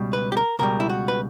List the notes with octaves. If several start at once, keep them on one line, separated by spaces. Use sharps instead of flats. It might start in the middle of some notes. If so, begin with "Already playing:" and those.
Already playing: C#2 B2 G3
B4
G4
A#4
C#2 B2 G3 A#4
E4
F#4
B4